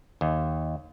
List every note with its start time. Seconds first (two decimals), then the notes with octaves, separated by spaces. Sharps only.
0.21 D#2